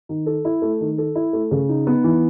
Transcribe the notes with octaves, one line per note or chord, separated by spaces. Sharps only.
D#3
A4
E4
A3
D#3
A4
E4
A3
C#3
D#4
B3
E3